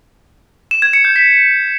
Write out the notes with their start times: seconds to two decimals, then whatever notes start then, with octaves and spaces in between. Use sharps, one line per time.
0.71 E7
0.82 G#6
0.93 C#7
1.05 G6
1.16 B6